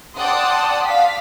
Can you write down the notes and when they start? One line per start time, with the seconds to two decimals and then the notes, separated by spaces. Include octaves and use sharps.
0.16 D5 F#5 G5 A5 C6 D#6
0.85 F5 B6